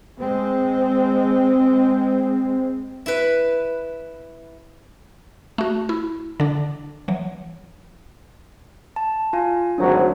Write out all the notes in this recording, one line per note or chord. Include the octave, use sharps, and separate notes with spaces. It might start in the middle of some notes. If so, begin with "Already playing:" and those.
G#3 C4
E4 B4
A3 F#4
E4
D3 D4
E3 F#3
A5
F4 F5 G#5
G#1 D2 F#3 D4 C5